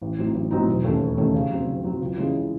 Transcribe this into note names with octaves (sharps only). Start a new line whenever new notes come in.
A1
A2 F#3 C4 D#4
A1
A2 F#3 C4 D#4
E1
D#2 D#3 A3 C#4
E1
D#2 D#3 A3 C#4
C#3
F#3 C4
C#3
F#3 C4
C#2
C#3 E3 G#3 C#4